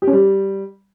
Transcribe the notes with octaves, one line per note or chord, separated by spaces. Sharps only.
G4
C#4
G3